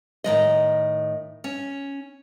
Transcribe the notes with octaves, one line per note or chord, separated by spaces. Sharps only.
A2 D#3 G#3 D#5
C#4